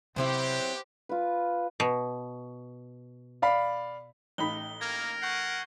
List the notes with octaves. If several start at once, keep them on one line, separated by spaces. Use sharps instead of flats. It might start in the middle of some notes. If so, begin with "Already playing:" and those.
C3 F#3 B3 C4 E4 G4 C5
F4 B4
B2
D5 F5 B5
A1 D#4 B5 G7
A#3 A#4 G#6
F#5 C#6 G6 C7